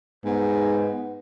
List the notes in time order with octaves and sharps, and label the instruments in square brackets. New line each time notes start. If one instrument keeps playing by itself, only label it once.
[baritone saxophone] G#2 [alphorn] B3